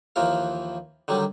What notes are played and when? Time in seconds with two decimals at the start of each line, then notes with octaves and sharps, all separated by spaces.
0.16 D#2 E3 F3 A#4 F5
1.08 D3 D#3 F#3 G3